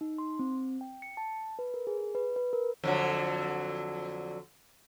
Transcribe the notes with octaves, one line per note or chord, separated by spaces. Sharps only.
D#4
C6
C4
G5
C#7
A5
B4
A#4
G#4
B4
B4
A#4
F2 D3 F#3